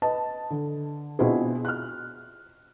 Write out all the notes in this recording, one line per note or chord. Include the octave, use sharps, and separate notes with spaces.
B4 D#5 A5
D3
B2 C4 D4 E4 F4 G#4
F6 F#6